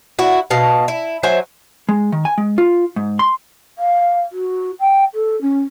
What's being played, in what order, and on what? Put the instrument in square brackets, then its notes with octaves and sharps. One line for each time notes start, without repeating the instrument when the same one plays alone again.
[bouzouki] E4 F#4
B2 F5 A5
E4
F#3 C5 E5 G#5
[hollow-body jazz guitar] G#3
D#3
G#5
G#3
F4
G#2
C6
[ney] F5
F#4
G5
A4
C#4